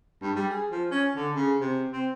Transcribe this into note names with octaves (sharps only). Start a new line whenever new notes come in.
G2
G3
G#4
F3
C#4
D3
C#3
C3
C4